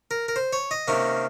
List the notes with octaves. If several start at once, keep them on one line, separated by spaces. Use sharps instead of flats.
A#4
A#4
C5
C#5
D#5
C3 D#3 A#3 C#4